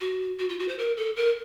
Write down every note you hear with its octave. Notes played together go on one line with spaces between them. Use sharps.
F#4
F#4
F4
F#4
C5
A#4
A4
A#4